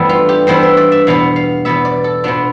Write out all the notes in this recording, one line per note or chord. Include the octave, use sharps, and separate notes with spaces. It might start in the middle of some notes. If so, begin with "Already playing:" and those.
Already playing: G2 E3 A3 B3 D4 G4 A4
F4
G4
G2 E3 B3 D4 C5
E5
D5
E5
E2 B2 B3 F5
F5
E2 B2 B3 E5
D5
A4
B2 B3 D4 F4